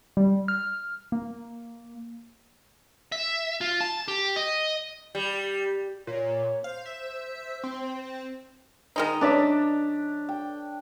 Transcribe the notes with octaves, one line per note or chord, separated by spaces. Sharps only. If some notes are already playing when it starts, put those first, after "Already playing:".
G3
F6
A#3
E5
F4
A5
G4
D#5
G3
A#2 C#5
C5 F5
E5
C4
D#3 G#3 D#4
C#4 D4 D5 E5
G5